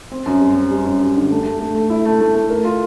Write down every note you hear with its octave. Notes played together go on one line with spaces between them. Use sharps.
C4
F#2
G3
C4
G3
F#2
F#2
D3
A3
A3
A3
A3
E4
A3
A3
A3
A#4
F4